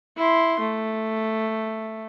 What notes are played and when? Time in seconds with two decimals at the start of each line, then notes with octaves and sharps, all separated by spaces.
0.17 E4 C6
0.60 A3